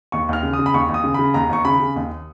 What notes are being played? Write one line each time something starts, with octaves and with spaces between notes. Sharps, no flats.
D#2 C#6
D#2 F6
C#3
D#6
C#3
B5
D#2 C#6
D#2
D#6
C#3
C#3 B5
D#2 A#5
D#2 C#6
C#3 B5
C#3
D#2